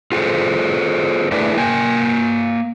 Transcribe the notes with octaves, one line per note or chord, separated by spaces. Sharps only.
F4 G#4 A4 C5
A3 D4 E4 G#4 B4 D5
A#3 G5 G#5